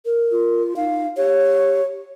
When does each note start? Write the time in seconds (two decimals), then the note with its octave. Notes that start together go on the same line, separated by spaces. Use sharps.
0.05 A#4
0.31 F4
0.76 D#4 F5
1.17 G4 C#5